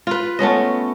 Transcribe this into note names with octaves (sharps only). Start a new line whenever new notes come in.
F4 B4
A3 B3 C#4 D#5